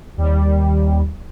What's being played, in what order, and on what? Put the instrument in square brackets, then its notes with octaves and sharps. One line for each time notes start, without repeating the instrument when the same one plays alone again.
[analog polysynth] D#2 G3